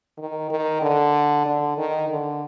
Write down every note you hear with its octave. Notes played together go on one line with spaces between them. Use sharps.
D#3
D#3
D3
D3
D#3
D3